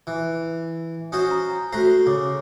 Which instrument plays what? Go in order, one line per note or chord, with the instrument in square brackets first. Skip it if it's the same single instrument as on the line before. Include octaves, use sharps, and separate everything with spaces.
[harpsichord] E3
[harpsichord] C#4 F#4 C5 [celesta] D#6
[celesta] A#5
[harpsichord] A3 C5 A#5 [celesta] F#4 F#6 C7
[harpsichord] C#3 [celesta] D6